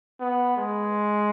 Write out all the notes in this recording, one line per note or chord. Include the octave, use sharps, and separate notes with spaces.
B3
G#3